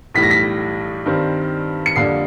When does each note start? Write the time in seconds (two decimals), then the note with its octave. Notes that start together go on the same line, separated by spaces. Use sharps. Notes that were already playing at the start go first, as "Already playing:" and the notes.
0.14 B1 A2 E3 G3 B6
0.23 A#6
0.31 B6
1.06 G2 D#3 G3 C4
1.86 C#7
1.96 F2 D3 G3 A#3 D4 C7